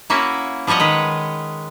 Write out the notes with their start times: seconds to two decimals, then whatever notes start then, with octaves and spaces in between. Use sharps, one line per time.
0.10 A#3 C#4 E4 F#4
0.67 F3 G3 C#5 D#5 F#5
0.80 D#3 G#3 B4